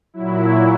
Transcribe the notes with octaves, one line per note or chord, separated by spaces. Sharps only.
A#2 F#3 E4